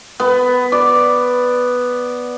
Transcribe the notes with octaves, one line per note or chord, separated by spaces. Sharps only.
B3
D5